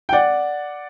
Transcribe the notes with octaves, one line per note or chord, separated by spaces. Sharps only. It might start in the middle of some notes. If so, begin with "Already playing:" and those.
G5
D5 F#5